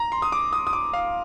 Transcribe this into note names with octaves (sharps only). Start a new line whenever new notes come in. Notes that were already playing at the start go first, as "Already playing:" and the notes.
Already playing: A#5
C6
D#6
D6
D#6
D#6
D6
F5